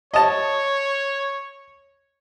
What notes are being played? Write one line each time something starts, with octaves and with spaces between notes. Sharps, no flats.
C#5 D#5 A5